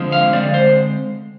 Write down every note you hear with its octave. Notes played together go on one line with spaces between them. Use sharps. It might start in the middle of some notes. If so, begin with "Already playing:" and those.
Already playing: D3 F3 G#3 C4 F4
F5
D3 G#3 C4 D5
C5